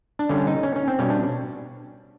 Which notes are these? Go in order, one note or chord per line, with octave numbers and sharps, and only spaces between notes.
D4
D3 G3 C#4
D#4
C#4
C#4
C4
B2 G3 C#4
D4